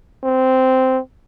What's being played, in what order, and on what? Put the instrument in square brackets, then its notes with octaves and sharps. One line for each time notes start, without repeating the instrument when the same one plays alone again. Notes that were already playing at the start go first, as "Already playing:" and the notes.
[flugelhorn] C4